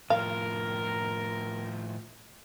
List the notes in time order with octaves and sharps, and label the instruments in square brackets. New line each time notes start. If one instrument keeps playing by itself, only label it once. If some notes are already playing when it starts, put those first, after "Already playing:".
[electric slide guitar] A2 F3 [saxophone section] A#4 [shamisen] F5